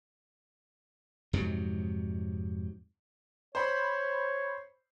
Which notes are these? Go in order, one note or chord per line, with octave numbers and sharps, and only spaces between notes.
F2 G#2 C3 F#3
C5 C#5 B5